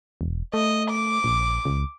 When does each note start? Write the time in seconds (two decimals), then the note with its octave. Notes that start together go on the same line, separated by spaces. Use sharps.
0.21 E1
0.54 A3 D#5
0.90 D6
1.24 A#1
1.65 C#2